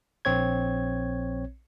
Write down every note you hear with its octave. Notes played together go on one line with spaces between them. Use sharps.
A#1 C4 C#5 G#6